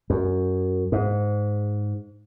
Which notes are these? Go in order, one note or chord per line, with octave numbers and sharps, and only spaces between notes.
F#2
G#2